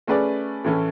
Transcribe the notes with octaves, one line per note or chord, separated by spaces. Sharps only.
A3 C#4 G#4 B4 D5
A2 E3 A3 C#4